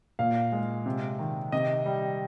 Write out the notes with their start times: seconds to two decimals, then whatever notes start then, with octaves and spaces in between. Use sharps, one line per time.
0.19 A#2 F5
0.52 G#3
0.86 C3
1.19 D#3
1.52 C3 D#5
1.86 G3